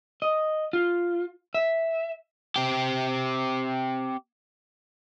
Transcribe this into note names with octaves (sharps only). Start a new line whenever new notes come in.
D#5
F4
E5
C4 G4